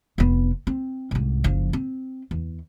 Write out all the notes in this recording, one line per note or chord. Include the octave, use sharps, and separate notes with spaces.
F1 B3
C4
C2 G#2
F#1 F3
C4
E2